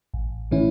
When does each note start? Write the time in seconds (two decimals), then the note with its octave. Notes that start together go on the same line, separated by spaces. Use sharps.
0.14 A1
0.51 A2 E3 C#4 E4